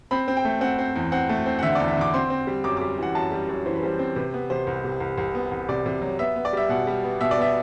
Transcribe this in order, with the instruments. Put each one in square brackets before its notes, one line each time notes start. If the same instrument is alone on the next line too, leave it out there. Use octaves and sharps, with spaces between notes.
[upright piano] C4 B5
C4
G5
A3
C4 F#5
C4
E2
C4 F#5
A3
C4
F#5
D3 E5
D5
E2
E5
D3 D6
C4 C6
C4
G3
F#2 D6
D6
G3
E3 F#5
F#2 A5
G3
F#2
E3 C5
B4
G3 C5
C4
C3 B4
B3 B4
C3 C5
C2
C3
C2
C2
B3
C2
C3 D5
C3
F#3
B3 E5
B3
D5
G3 E5
B2 F#5
G3
B3
B2 E5
D5
B3 E5